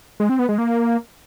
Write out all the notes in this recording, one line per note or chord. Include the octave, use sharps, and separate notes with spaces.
G#3
C4
B3
G#3
A#3